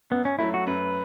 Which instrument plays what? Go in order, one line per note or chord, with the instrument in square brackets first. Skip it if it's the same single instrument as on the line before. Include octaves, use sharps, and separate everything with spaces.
[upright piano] F#2 [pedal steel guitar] B3
[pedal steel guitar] C#4
[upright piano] F#3 A3 [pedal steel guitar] E4
[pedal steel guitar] F#4
[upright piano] F#2 [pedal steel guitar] B4